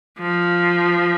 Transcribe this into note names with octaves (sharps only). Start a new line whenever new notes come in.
F3